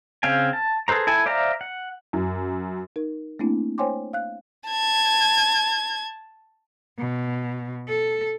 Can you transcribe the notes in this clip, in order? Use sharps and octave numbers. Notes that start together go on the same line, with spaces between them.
C#3 C4 F5 G5 G#5
A5
G#4 A4 B4 C5 A#5
E4 A4 G#5
C5 D5 E5 F5 A#5
F#5
F#2
D#4 A#4
A3 A#3 C4 D4 E4
C5 C#5 G5 G#5 C6 D6
F5 F#6
A5 G#6
B2
A4